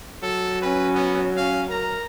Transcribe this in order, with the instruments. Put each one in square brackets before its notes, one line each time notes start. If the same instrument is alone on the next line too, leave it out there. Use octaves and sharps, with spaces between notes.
[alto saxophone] F#3 [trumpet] A4
[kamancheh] C#4 [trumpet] B4
[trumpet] B3
[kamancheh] C#4 [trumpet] F5
[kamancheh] A#4 [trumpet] A#5